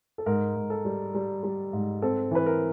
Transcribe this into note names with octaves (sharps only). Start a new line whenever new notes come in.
A4
G#2 A#4
G#2
A4
G3
G3
G3
G#2
C4 A4
E3 B4
A#4